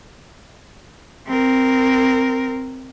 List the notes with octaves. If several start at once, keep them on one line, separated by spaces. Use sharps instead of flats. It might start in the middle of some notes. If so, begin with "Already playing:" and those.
C4 A#4